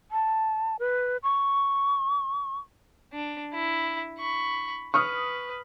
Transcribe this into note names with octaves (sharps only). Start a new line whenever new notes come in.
A5
B4
C#6
D4
E4
B5 C#6
B4 C#6 D#6 F6